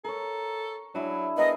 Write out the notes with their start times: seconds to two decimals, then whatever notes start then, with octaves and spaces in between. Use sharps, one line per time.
0.05 A4 A#4 C#5
0.95 F#3 D4 E4 G#4
1.37 B3 G#4 A#4 B4 D#5